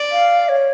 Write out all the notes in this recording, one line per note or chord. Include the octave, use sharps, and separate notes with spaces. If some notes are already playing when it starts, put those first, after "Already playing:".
Already playing: D5
F5
C#5